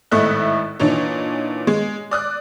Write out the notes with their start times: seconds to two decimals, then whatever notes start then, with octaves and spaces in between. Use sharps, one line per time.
0.11 G#1 A2 A3 D#5 E5 F#6
0.80 A#2 E3 D4 D#4 C#5
1.67 G#3
2.11 D5 D#6 F#6